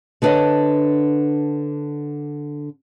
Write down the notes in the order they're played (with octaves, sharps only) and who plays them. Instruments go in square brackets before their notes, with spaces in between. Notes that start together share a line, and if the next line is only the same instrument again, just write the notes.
[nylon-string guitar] D3 B3 D4 B4 C#5 D#5